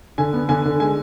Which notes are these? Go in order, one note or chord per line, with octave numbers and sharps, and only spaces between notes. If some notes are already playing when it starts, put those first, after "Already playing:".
D3 G#5
B3
D3 G#5
D3
G#3 G#5